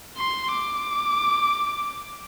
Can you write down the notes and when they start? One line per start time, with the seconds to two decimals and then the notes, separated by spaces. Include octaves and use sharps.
0.18 C6
0.57 D6